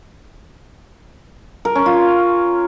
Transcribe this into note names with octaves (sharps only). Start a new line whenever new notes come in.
A#4
C#4
F4